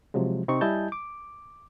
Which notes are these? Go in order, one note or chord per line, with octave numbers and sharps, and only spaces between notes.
C3 F3 F#3 G#3
C3 C4 D#4 C#6
G3 E4 D#5 G#5 A5 G6
D6